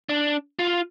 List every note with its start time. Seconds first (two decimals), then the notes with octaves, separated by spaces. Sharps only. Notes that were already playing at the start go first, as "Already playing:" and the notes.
0.09 D4
0.59 F4